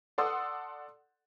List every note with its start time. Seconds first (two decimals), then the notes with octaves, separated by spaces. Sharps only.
0.18 A4 D5 F#5 C6 D#6 E6